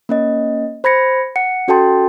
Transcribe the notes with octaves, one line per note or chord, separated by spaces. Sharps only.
A#3 C#4 D#5
C5 B5 G#6 A#6 C#7
F#5 C#7
C#4 F#4 A4 G5 A5 C6